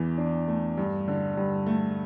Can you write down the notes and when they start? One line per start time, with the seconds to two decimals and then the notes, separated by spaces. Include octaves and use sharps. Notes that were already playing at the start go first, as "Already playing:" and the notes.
Already playing: E2 E3
0.18 D4
0.48 A3
0.77 G2
1.08 D3
1.37 G2
1.67 A3